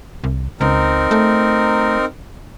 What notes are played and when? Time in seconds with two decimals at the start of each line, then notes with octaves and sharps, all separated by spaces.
0.24 C2
0.61 C#2 C4 D#4 A#4
1.11 A3